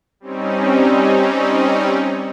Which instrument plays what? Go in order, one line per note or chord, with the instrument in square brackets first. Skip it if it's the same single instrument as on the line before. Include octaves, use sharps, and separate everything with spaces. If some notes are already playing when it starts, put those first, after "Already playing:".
[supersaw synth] G3 C4 C#4 D#4